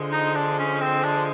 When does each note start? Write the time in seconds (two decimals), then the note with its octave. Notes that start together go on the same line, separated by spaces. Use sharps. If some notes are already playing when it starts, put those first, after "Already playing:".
Already playing: D3 F3 G#3
0.12 D#4
0.35 D4
0.59 C#4
0.80 C4
1.03 D4